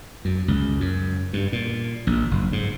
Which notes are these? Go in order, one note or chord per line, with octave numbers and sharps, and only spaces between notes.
F#2
C#2
F#2
G2
A#2
A#1
F#1
G#2